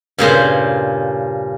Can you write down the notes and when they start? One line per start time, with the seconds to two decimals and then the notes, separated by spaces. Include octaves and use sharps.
0.18 G2 A#2 C#3 C5